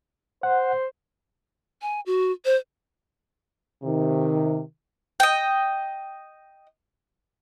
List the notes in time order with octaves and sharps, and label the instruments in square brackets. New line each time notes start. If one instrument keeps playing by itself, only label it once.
[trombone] C5 [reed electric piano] F#5
[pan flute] G#5
F#4
C5
[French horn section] C3 D#3
[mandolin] D#5 G5